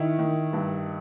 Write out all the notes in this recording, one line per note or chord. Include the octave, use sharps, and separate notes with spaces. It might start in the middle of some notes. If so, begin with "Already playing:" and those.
Already playing: D#3 E4
D#3
G2